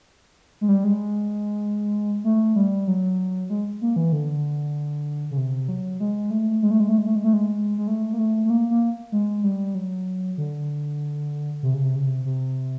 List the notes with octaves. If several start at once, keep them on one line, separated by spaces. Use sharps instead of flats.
G#3
G3
G#3
A3
G3
F#3
G#3
A#3
E3
D3
C#3
C3
F#3
G#3
A3
G#3
A3
G#3
A3
G#3
A3
G#3
A3
G#3
G#3
A3
A#3
A3
A3
A#3
A#3
G#3
G3
F#3
D3
C3
C#3
C3
C#3
C3
C3